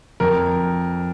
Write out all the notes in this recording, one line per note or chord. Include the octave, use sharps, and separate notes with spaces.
F2 A#4